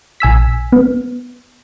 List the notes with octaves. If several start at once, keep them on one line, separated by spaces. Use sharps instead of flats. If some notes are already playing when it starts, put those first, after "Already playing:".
A#1 G#5 E6 B6
B3